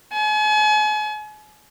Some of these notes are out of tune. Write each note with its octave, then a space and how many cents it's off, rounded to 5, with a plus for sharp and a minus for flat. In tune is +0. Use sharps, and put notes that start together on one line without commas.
G#5 +40